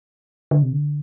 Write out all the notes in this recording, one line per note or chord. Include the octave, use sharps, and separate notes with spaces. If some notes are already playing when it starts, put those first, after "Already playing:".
D3
C3
D3